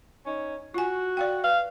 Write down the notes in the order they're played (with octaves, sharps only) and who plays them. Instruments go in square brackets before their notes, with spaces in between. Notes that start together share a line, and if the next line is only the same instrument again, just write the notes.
[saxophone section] C#4 D#4 C#5
[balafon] F4 G#5 [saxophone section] F#4
[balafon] D5 F5 G5
[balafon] B4 [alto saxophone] F5